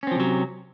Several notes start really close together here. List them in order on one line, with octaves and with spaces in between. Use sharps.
C#4 C4 F3 C3 F#3